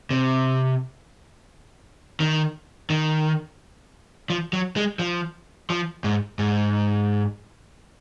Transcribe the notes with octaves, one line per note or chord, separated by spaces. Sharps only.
C3
D#3
D#3
F3
F#3
G#3
F3
F3
G#2
G#2